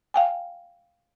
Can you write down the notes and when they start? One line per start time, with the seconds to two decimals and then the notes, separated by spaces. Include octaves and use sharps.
0.14 F5 G5 G#5